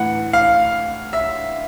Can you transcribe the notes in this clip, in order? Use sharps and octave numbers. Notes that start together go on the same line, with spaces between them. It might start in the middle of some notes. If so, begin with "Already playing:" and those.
Already playing: A2 E3 F#5
F5
E5